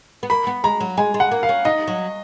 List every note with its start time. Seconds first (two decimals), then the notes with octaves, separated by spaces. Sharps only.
0.23 B3
0.30 A#3 B5
0.47 B3
0.64 G#3 A#5
0.80 F#3
0.97 G#3 G#5
1.14 G#3
1.20 F#5
1.31 A#3
1.43 F5
1.49 C#4
1.65 D#4 D#5
1.87 F#3